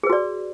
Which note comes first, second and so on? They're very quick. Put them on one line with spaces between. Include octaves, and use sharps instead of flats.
G#4 B4 F#4 D5